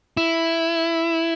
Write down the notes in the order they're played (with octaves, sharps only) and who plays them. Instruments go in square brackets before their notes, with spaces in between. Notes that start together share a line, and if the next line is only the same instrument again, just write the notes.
[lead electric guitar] E4